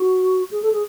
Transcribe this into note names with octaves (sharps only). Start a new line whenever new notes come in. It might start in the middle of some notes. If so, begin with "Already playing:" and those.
Already playing: F#4
G#4
A4
G#4